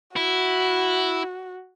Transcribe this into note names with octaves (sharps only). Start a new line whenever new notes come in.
E4 F#4